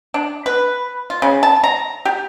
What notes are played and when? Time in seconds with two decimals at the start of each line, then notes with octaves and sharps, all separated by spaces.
0.14 D4
0.46 B4
1.10 F4
1.22 C#3
1.43 A5
1.64 A#5
2.05 G4